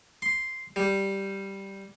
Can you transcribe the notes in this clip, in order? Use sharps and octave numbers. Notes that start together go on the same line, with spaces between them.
C6
G3